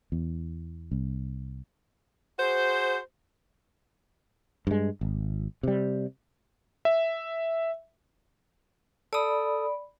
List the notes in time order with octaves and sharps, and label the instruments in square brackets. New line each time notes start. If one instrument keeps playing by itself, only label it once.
[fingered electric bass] E2
C2
[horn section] F#4 G#4 C5
[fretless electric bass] G2 G#3
G#1
C3 G3
[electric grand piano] E5
[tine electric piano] A4 D#6 [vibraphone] D5 B5